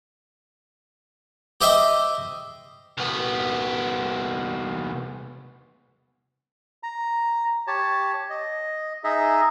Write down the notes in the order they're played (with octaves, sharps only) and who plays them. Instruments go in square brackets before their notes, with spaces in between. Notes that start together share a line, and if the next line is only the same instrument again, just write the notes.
[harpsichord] G4 C5 D#5 E5 G5
[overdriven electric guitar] C2 B3
[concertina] A#5
G4 C#5 A5
D#5
D#4 G#4 D#5 E5